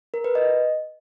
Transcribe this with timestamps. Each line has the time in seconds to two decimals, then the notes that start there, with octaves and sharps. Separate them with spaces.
0.14 A#4
0.24 B4
0.35 D#5